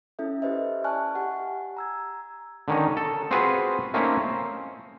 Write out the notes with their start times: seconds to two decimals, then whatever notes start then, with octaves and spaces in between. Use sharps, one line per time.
0.19 C#4 E4 A4 E5
0.42 E4 G4 B4 C5 D#5 E5
0.84 D5 G#5 A5 C#6 F6 F#6
1.15 G4 F#5 G#5
1.77 A#5 E6 G#6
2.68 D3 D#3 C#4 D#4
2.97 A4
3.31 C4 F4 F#4 G#4 B4 C5
3.94 A3 A#3 C4 C#4 D#4 E4
4.27 C5